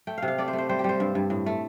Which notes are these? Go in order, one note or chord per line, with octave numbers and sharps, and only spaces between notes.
A3 G5
F5
C3
F5
A3 D5
C5
A3
C5
G3 C5
G4
G3 C5
G2
G2
A2
A3